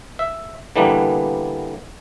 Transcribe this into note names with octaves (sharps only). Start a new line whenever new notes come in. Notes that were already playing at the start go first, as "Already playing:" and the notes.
E5
D3 E3 G3 A#3 B3 D4